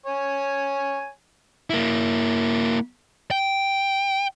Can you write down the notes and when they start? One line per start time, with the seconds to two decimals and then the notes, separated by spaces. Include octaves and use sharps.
0.06 C#5 G#5
1.70 A#3 E4
3.31 G5